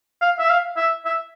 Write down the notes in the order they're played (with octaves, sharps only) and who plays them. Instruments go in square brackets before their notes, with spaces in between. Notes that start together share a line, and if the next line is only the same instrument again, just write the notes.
[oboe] F5
E5
F5
E5
E5